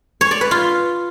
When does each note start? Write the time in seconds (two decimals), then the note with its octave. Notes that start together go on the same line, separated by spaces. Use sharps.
0.21 C#5
0.31 D5
0.41 B4
0.51 F4